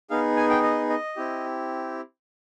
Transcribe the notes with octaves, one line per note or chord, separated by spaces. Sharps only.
B3 D#4 G#4 F5
G#5
G5
D#5
D#5
C4 E4 G4